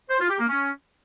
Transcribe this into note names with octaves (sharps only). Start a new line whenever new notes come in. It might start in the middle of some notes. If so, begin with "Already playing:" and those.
C5
F4
G4
A#3
C#4